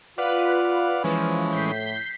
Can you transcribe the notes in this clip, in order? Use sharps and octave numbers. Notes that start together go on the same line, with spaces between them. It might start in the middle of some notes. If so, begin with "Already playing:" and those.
F4 B4 D5 F5 F#5
E3 F3 G#3 C#4
A2 G6 B6 C7